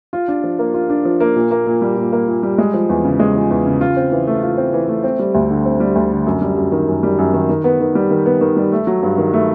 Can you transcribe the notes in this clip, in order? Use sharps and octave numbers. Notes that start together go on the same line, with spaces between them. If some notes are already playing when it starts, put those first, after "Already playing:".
F4
D4
F3
A#3
F4
D4
F3
A#3
A#2
A#3
A#2
G3
A#2
A#3
A#2
G3
G#3
F3
E2
C#3
G#3
F3
E2
C#3
F4
C4
E3
A3
F4
C4
E3
A3
C4
G3
D2
D3
C4
G3
D2
D3
F#2
G3
F#2
D#3
F#2
G3
F#2
D#3
D#3
B3
D#3
G3
D#3
B3
D#3
G3
A3
F#3
G2
D#3
A3